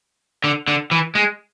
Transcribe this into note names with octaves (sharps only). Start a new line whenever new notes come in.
D3
D3
E3
G#3